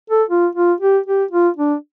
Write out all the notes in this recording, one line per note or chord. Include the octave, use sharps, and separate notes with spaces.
A4
F4
F4
G4
G4
F4
D4